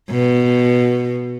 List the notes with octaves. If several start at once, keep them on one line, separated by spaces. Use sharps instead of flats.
B2